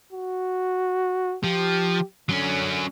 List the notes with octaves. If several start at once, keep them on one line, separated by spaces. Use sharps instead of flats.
F#4
F3 G4
D3 F#3 C#4